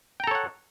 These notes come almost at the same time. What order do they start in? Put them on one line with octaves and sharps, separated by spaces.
G5 A#5 A4 C#5 F#5